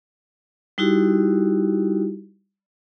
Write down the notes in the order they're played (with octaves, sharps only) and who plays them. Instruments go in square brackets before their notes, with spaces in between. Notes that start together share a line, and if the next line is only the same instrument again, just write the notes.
[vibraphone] G3 D#4 E4 F#4 G4